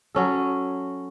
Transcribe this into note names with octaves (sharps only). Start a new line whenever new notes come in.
F#3 C#4 A4